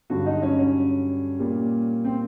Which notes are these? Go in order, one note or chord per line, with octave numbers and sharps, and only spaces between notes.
G2 D3 F#3 F#4
D#4
C#4
C#4
A#2 G3 A#3
C4